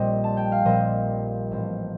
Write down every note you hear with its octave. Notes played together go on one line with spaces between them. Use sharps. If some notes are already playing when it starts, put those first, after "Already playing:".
Already playing: A#1 A#2 G3 C4 C5 D#5
A5
G5
F5
A#1 A#2 G3 C4 C5 D#5
A1 A2 A3 C4